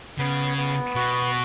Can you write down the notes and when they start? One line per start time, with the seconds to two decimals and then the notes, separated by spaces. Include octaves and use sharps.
0.19 C#3 B3
0.58 B3
0.95 B2 F#4